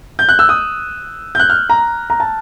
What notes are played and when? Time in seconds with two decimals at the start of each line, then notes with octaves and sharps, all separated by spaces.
0.19 G6
0.29 F#6
0.39 E6
0.49 D#6
1.35 G6
1.39 F#6
1.50 F6
1.69 A#5
2.10 A#5
2.20 A5